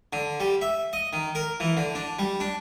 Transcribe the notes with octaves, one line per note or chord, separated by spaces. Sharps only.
D3
G3
E5
D#5
D#3
A#4
E3
D3
D4
G3
D4